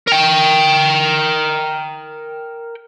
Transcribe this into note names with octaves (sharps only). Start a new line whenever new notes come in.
A#4 G5